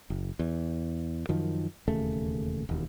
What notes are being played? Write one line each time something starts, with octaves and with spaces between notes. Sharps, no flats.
F#1
E2
F#2 D#3 F3
E1 D#2 C#3 A3
E1 D#2